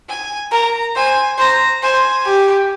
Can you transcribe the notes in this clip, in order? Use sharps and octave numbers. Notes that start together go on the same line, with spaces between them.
G#5
A#4 A#5
C5 G#5
C5 A#5
C5 G#5
G4